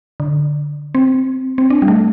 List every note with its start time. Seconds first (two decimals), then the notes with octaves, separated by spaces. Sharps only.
0.20 D3
0.95 C4
1.58 C4
1.70 D4
1.82 G3
1.88 A3